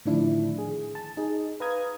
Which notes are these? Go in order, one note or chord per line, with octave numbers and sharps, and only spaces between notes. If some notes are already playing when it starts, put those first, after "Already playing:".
A2 D3 D#3 F3 D4 E4
G#4
A5
D#4 G#4
B4 F5 A#5 D#6 G#6